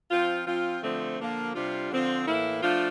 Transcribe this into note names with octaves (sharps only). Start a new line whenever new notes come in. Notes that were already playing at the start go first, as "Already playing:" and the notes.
F3 C4 F4
F3 C4 F4
D3 F3 A3 C4
D3 F3 A#3 D4 F4
C3 G3 D4 F4
D3 F3 C4 F4
A2 E3 A#3 E4
F3 A3 D4 F4